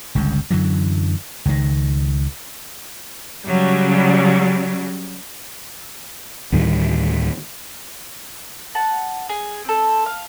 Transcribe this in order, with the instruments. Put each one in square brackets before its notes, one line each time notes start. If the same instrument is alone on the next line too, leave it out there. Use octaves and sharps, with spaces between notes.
[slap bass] G1 C#2 G2
F#2 D3 E3 F#3
C#2 D#3
[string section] C#3 F#3 G3
[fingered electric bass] D2 A2 D#3 G3
[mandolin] F#5 A5
G#4
C4 A4
F5